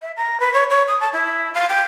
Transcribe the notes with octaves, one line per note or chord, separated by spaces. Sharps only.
E5
A#5
B4
C#5
C#5
D#6
A5
E4
F5
G5